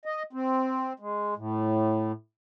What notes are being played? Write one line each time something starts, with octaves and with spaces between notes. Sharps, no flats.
D#5
C4
G#3
A2